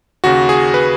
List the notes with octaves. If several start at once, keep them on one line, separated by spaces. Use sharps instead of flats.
D#2 C#3 F#4
G#4
B4